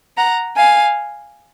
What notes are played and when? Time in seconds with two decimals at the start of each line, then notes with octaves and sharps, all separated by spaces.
0.17 F#5 A#5
0.56 F5 G#5